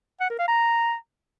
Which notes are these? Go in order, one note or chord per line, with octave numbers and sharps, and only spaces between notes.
F#5
A#4
F5
A#5